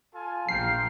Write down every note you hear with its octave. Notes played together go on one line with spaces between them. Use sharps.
F4 A4 G#5
A#1 F3 F5 G5 A#5 C7